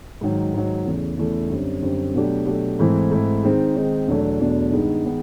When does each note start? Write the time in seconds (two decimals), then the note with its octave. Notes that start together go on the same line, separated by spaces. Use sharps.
0.21 G#2 D#3 F#3
0.54 G#2 D#3 F#3
0.86 E2 C#3 E3 A3
1.17 E2 C#3 E3 A3
1.50 F#2 D3 G3 C4
1.82 F#2 D3 G3 C4
2.14 B2 F#3 A3 D4 G4
2.47 B2 F#3 A3 D4 G4
2.79 G#2 E3 A3 C4 E4
3.11 G#2 E3 A3 C4 E4
3.44 D#3 G#3 C4 D#4
3.76 D#3 G#3 C4 D#4
4.08 E2 B2 F#3 A3 D4
4.41 E2 B2 F#3 A3 D4
4.72 G2 D#3 G#3 B3 D#4
5.05 D#3 G#3 B3 D#4